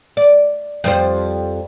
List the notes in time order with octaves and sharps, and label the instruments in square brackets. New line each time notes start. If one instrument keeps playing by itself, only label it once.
[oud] D5
F2 G3 C5